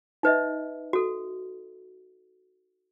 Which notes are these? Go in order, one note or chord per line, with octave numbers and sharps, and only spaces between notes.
D#4 B4 D#5 E5
F#4 A4